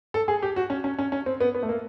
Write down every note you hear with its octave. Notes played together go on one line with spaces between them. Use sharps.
A4
G#4
G4
F#4
C#4
C#4
C#4
C#4
C4
B3
B3
A3
A#3